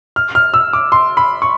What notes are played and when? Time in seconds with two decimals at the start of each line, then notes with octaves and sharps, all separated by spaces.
0.16 F6
0.35 F6
0.54 E6
0.73 D6
0.92 C6
1.17 B5
1.42 C#6